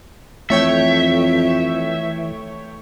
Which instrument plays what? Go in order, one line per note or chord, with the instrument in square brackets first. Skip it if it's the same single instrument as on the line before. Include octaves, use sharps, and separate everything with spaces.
[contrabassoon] F2 [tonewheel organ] E3 [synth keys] A3 C#5 G5 [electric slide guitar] E5